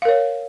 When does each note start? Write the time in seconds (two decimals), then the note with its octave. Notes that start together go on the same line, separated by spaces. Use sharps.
0.02 F5
0.05 A#4
0.09 C#5